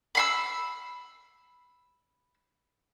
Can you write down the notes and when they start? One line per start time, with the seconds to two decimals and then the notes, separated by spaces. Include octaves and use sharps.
0.15 B5 C6 E6